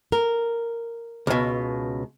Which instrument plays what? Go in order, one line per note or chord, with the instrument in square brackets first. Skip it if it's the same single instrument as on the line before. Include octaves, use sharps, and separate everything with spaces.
[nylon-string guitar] A#4
[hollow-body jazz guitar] C#2 B2